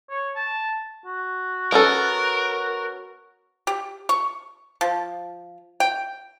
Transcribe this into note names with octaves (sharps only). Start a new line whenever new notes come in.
C#5
A5
F#4
B3 C#4 A4 A#4
G4
C#6
F3
G5